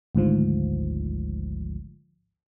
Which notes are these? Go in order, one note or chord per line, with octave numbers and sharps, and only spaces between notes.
G#1 D2 G#2 F3